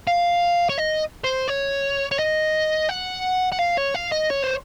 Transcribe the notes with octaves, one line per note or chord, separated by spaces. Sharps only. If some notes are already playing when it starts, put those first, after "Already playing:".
F5
C#5
D#5
C5
C#5
C#5
D#5
F#5
F#5
F5
C#5
F5
D#5
C#5
C5